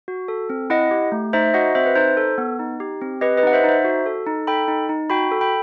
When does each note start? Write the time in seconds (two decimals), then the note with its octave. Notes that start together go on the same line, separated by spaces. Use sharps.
0.08 F#4
0.28 A4
0.50 C4
0.70 E4 D#5 F#5
0.91 G4
1.12 A3
1.33 D#4 C5 E5
1.54 F#4 D#5 F#5
1.75 C4 C5 E5
1.86 B4
1.96 D#4 C5
2.17 A4
2.38 B3
2.59 D#4
2.80 G4
3.01 C4
3.21 G4 B4 D#5
3.37 B4 D#5
3.43 D#4 F#5
3.53 C5 E5
3.64 D#4 C5 E5
3.85 F#4
4.06 A4
4.27 D#4
4.47 A4 G5 B5
4.68 D#4
4.89 D#4
5.10 F#4 G5 B5
5.32 A4
5.41 G5 B5